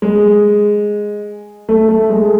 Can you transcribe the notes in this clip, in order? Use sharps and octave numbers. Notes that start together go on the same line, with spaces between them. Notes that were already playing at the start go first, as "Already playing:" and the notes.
G#3
A3
A3
G#3